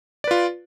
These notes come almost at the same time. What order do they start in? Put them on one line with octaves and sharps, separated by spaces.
D5 B4 F4